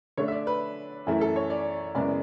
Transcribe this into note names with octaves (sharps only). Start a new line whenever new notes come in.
D3 A3 D4 C#5
E5
D5
B4
F#2 E3 A3 E4
A4
C#5
D5
F#2 C#3 G#3 B3 E4 D5